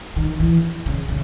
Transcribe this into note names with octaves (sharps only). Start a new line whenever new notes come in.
D#3
E3
C#3
C#3